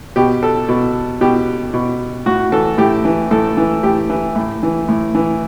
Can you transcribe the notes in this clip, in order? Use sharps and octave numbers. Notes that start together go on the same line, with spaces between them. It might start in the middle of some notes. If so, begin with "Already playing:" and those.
B2 G4
A4
B2
B2 G4
B2
A2 F#4
E3 A4
A2 G4
E3
A2 A4
E3
A2 G4
E3
A2
E3
A2
E3